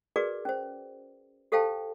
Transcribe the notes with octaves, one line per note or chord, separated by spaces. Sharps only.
F#4 G#4 A#4 B4 D5 D6
C#4 C5
G4 A4 C5 F5 G5 A5